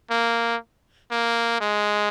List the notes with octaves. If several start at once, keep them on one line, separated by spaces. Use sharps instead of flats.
A#3
A#3
G#3